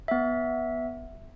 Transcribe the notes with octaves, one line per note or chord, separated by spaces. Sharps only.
B3 E5